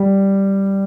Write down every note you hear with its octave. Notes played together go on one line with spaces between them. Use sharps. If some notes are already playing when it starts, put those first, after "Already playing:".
Already playing: G3